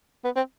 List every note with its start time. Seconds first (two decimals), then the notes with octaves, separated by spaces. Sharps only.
0.25 B3
0.36 C4